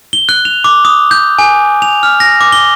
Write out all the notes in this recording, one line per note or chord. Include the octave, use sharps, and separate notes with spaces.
G7
F#6
F7
D6
D#6
G6
G#5
F7
F6
A#6
D6
G7